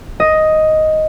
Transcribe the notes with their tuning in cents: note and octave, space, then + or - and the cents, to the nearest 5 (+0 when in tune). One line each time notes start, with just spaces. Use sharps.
D#5 +5